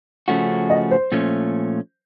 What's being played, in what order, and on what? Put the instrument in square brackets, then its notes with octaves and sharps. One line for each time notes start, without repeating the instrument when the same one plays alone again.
[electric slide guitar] C#3 F3 A3 C#4 F#4
[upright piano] D#5
C5
[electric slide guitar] A#2 F3 A3 C#4